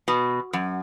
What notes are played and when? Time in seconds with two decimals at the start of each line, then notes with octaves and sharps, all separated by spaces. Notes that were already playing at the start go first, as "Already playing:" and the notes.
0.08 B2
0.53 F#2